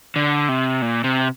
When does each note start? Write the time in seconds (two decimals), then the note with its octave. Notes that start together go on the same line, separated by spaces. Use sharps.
0.16 D3
0.49 C3
0.82 A#2
1.04 C3